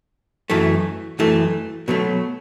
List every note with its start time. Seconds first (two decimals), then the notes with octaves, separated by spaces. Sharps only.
0.50 F#2 E3 A3
1.19 F#2 E3 A3
1.88 B2 F#3 A3